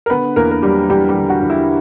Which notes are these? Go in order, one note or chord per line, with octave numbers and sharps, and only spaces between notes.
A#4
D3 B3 B4
E2 A#3 A#4
A#4
F#3 G3 G4
E2 G3 G4
G3 G4
D3
F#4
E2
E4